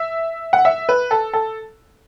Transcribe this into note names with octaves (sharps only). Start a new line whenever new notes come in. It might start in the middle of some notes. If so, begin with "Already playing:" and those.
Already playing: E5
F#5
E5
B4
A4
A4